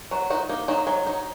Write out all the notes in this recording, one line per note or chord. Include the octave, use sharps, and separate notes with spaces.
F#3 F#4
D#4 F#4
A#3 D#4
F#3 D#4
F#3
D#4